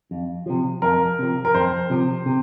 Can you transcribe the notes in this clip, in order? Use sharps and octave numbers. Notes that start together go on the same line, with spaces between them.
F2
C3 F3
F2 A#4
C3 F3
A#4
F2 C5
C3 F3
C3